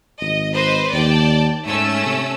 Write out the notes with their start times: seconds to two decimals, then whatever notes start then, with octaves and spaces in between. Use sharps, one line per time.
0.21 G#1 D#5
0.53 B4 C5 D#5
0.93 D#2 D5 G5 A5
1.67 G#2 A3 C#4 E6
2.06 C3